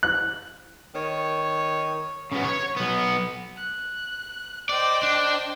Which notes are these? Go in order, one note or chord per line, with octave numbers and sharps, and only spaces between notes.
F#6
D#3 C#5
C#3 B3
C#5
B1 B3
F#6
C5 D5 D#5 G5
D4